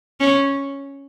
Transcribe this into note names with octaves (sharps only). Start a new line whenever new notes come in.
C#4